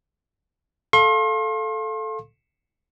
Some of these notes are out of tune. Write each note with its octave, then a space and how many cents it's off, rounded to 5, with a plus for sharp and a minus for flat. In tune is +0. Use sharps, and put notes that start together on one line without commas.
A4 -5 F5 +0 C6 +40